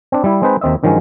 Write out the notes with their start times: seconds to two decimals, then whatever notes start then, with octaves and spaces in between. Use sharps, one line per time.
0.12 C4 D4
0.24 G3 E4
0.42 G#3 C4 D#4 G#4 B4 C5
0.61 D#2 D#3 C4 D#5 E5
0.83 G2 D#3 F3 F#3 G#3 C#4